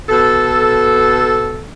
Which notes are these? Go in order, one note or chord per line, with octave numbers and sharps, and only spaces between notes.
B2 A4